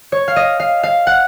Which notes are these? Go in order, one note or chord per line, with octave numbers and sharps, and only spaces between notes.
C#5
F5
D#5
F5
F5
F#5